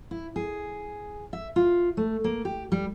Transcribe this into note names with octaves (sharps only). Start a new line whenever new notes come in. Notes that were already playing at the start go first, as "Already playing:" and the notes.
E4
G#4
E5
F4
A3
A#3
G4
G3